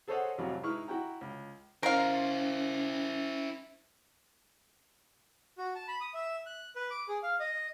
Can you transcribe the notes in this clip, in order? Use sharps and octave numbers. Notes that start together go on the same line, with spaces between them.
G#4 A4 C5 C#5 D#5 F#5
A1 F2 C3 F#3 F5 B5
G#3 D#4 E4 B4 C#6 F6
E4 F#4 F#5 G5 A#5
C#2
C#4 E4 A#4 C5 F5
F#4
A5
B5
D#6
E5
F#6
B4
D6
G#4
F5
D#5